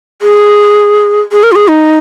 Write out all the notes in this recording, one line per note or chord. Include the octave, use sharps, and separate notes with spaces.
G#4
G#4
A#4
F4
G#4
D#4